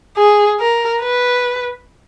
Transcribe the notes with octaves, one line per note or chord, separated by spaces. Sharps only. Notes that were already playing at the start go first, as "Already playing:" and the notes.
G#4
A#4
B4